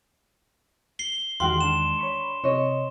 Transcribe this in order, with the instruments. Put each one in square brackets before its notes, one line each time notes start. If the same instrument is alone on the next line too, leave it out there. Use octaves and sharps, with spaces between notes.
[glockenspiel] C7 G7
[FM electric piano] E2 D#3 G#3 [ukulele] F#4 G4 F5 [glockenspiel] C6
[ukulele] D4 [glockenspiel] E7
[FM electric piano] C#5 B5 C#6
[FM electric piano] C3 [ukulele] C#5 D#5